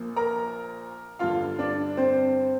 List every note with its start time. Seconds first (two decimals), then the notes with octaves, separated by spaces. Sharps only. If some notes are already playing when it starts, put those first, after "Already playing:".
Already playing: A#1 A#2 A#3
0.16 A#4 A#5
1.19 G1 G2 D3 F4 F5
1.59 D4 D5
1.97 C4 C5